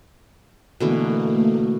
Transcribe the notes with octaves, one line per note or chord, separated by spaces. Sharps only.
B2 D3 E3 A3 A#3